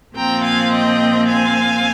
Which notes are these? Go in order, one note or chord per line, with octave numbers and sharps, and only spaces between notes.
A#2 F3 C4 G5 A#5
F5 G#5
D#5 G5
F5 G#5